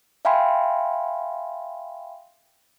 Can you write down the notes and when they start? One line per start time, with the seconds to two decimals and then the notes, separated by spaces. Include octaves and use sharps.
0.25 E5 F5 G5 G#5 B5 C6